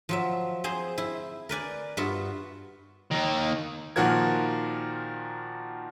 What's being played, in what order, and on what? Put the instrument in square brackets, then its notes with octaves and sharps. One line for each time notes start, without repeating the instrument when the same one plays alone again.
[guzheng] F3 F#3 E5
C4 G#4 C5 A#5
E4
A#4 B4 D5 G#5
G2 B3 F4 F#4 E5 F#5
[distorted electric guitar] D#2 D#3
[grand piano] A#2 D#3 F3 F#4 A#4 G#6